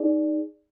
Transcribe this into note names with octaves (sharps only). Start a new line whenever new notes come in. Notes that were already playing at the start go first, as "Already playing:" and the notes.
Already playing: D#4 G#4 D5